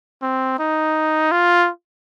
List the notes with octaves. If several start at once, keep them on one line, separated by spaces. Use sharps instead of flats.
C4
D#4
F4